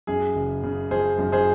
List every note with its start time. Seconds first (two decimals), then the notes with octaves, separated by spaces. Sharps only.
0.07 F#2 G#4
0.36 F#1
0.63 C#3
0.91 F3 G#4 C5
1.19 F#2
1.32 G#4 C5